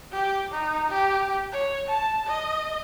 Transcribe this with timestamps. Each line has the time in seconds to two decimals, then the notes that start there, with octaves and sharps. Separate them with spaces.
0.12 G4
0.52 D#4
0.89 G4
1.52 C#5
1.88 A5
2.27 D#5